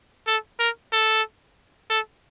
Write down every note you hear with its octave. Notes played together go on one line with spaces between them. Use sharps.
A4
A#4
A4
A4